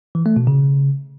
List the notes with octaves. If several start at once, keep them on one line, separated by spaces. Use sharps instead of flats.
E3
A3
B2
C#3